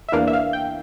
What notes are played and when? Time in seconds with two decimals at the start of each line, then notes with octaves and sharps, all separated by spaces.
0.09 E5
0.12 E2 E3 A#3 D4 F5
0.27 E5
0.33 F5
0.53 G5